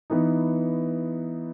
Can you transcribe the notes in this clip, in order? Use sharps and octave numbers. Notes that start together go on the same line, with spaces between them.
E3 B3 D#4